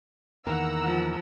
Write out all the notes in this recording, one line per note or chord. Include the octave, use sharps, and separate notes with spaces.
E2 D#3 A#3 A#4 F#5 A#5 E6
F3